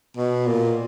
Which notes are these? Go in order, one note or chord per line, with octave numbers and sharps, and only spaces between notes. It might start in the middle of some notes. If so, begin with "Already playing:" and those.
B2
A#2